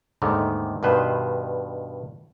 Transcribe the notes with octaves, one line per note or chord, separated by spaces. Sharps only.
D#2 G#2 D3 D#3 A3
G2 B2 D#3 B4 C5